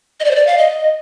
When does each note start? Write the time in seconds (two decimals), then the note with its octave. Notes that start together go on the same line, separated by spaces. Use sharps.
0.20 D#5
0.24 D5
0.31 C5
0.35 D5
0.47 F5
0.58 D#5